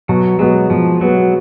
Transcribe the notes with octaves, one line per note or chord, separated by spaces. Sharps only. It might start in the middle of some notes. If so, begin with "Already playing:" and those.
B2 F#3
F#3 G#3 B3 F#4
B2 F3
F#3 G#3 B3 F#4